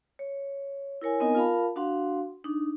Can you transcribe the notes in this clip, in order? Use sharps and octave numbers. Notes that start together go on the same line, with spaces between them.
C#5
E4 A#4 C#5 G#5
B3 C4 D#4 A#4 D#5 G#5
F4 A#4 F5 A5 B5
D4 F#4 F5 F#5 C6
D4 D#4